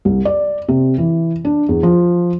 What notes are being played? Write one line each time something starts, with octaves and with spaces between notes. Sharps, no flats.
C2
D5
C3
E3
D4
E2
F3